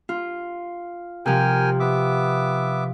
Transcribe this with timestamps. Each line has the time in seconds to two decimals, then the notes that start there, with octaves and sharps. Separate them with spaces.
0.09 F4
1.26 C3 F3 A#4 G5 G#5
1.80 B3 E5 D6